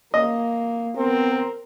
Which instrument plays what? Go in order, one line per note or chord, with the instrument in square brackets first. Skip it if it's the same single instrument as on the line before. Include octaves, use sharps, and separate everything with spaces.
[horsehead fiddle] A#3 [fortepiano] D#5
[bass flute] B3 [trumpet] C4 [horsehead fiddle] A#4